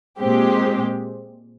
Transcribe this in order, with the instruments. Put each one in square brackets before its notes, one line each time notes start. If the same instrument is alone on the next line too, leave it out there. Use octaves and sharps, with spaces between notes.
[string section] A#2 G#3 C4 G4